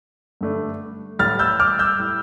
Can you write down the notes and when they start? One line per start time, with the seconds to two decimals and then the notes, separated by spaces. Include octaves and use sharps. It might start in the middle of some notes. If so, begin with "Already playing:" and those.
0.41 G2 D3 A3 D4
1.19 A1 A2 G3 F6 A6
1.39 E6 G6
1.60 D6 F6
1.79 E6 G6
1.99 A2 G3